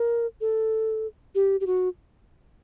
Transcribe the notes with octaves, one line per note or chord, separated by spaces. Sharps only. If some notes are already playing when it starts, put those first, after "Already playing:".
Already playing: A#4
A4
G4
G4
F#4